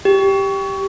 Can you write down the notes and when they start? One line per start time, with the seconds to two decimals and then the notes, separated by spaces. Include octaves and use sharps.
0.05 G4